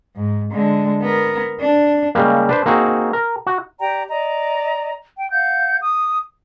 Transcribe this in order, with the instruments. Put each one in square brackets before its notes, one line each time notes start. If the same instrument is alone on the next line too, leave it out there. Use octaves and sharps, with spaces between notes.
[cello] G#2
D3 G#3
B3 A#4
D4
[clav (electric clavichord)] C#3 G3 G#3 A#3
D4 B4 C5
A#3 C4 D#4 F#4 G#4
A#4
F#4
[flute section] G4 D5 G5 A#5
D5 D#5 A#5
G5
F5 F#5 G6
D#6